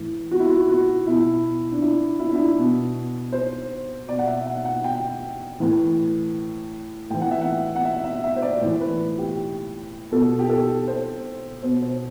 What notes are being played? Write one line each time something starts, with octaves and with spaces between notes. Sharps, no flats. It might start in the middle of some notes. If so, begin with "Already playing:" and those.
Already playing: A2 E3
F#4
E4
F#4
F#4
B2 E4
D4
E4
E4
D4
E4
B2
C5
B2 D5
F#5
E5
F#5
F#5
G5
A2 E3
A2 E3 G5
F#5
E5
F#5
F#5
E5
E5
E5
C5
D5
A2 E3 C5
B4
G4
B2 A4
G4
A4
C5
B2 C5
C5